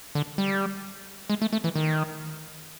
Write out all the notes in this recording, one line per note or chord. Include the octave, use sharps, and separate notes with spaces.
D3
G3
G#3
A3
A3
E3
D#3